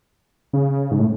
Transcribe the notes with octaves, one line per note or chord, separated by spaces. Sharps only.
C#3
G#2
A2